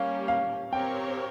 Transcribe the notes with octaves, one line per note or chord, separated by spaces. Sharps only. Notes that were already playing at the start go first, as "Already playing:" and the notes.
Already playing: G3 A#3 C#4 G4 F5
F5
C4 G4 A#4 C#5 G5